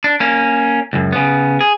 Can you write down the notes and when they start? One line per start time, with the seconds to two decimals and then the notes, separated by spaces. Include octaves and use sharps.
0.04 D4
0.20 A#3 C#4
0.93 C#2 F#2
1.12 C#3 B3
1.61 G#4